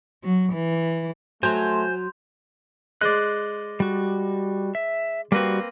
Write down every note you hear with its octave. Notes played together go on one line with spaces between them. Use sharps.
F#3
E3
F#3 A3 C5 G#5 C6 G6
G#3 C5 D5 F#6
G3 F#4
E5
G3 A#3 C4 F#4 B4